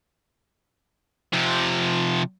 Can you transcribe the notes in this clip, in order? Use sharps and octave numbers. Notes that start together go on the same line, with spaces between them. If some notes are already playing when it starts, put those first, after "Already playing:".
C3 F3